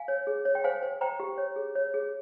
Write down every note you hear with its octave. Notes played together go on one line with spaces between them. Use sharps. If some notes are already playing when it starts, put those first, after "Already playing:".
Already playing: F5 G#5
C#5
G#4
C#5
G5
C5 F5 G#5
C5
C5 G5 A#5
G4
C#5
G#4
C#5
G#4